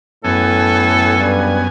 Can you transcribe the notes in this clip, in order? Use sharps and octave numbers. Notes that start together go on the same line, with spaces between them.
F#2 A2 B3 A4 G#5
G2